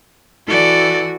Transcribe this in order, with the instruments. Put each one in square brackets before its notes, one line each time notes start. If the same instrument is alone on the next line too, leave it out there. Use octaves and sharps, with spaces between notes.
[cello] E3 F#4 [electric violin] A4 D5